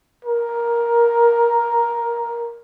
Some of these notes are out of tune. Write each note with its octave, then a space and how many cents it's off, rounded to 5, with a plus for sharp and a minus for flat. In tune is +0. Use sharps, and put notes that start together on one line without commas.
A#4 +10